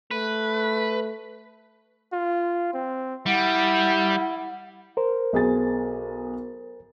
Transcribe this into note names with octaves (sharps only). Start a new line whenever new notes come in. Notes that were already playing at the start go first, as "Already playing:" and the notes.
A3 B4
F4
C4
G3 E4 F#5
A#4 C5
B1 G#4 A6